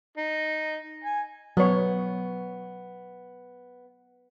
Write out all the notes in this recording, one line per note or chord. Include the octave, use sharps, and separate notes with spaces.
D#4
G#5
F#3 B3 C#5